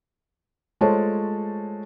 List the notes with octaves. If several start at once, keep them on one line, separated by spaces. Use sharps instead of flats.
G#3 A3 F4 C5 C#5 A5